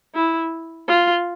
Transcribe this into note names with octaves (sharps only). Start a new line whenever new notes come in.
E4
F4